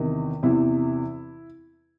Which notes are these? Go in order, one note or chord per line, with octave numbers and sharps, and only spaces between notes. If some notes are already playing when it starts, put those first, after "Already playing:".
Already playing: E2 C3 D#3
E2 C3 E3 E4